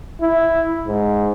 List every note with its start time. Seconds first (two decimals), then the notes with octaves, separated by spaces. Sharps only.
0.21 E4
0.87 G#2